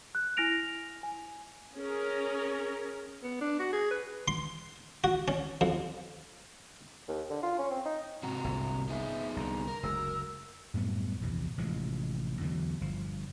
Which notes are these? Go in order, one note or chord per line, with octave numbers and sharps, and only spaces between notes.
F#6
E4 G#5 F6 A#6 D7 F7
G#5
C#4 G#4 A#4
B3
D4
F#4
G#4
B4
C6
F#4
C#4
F2
D#2
D3
F4
C#4
C4
D#4
G#2 C3 F#4 A#5
G1 C2
B3 D#4 G#4 E5
C2 D3 A#5
A#4
F#1 D2 G#3 E6
F#2 A2 G3 B3
A#1 E2 C3
A1 C3 F3 G#3
E2 D3 E3 F#3
G1 F3